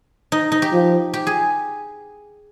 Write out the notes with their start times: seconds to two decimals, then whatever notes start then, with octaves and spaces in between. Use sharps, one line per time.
0.32 D#4
0.52 D#4
0.62 G4
0.73 F3
1.14 G4
1.27 G#4